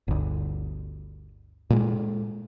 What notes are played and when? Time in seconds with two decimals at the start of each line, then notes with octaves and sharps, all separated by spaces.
0.08 G1 D2
1.70 A#2 G#3